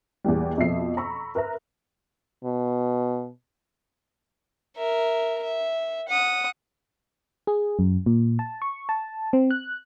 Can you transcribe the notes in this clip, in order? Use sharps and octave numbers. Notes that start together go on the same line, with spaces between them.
E2 A#2 E3 G3
F2 B2 F3 E5 C7
A#5 B5 C#6 E6
A#4 B4 E5 A#5
B2
A#4 E5
E5
F#5 D#6
G#4
F#2
A#2
A5
C#6
A5
C4
F#6